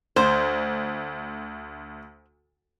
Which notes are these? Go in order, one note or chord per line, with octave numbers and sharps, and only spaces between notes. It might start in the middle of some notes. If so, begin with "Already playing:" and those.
D2 C5